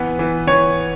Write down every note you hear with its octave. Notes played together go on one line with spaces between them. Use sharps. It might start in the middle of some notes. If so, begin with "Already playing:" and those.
Already playing: E3 B3
E3
E3 C#5